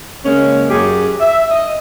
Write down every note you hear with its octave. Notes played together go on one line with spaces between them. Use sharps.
C#3 G#3 A#3 C#4
F#2 G4 G#4
E5
D#5